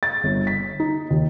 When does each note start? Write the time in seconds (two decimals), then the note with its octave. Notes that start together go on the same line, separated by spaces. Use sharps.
0.03 A6
0.24 G1
0.47 B6
0.80 D#4
1.10 D#2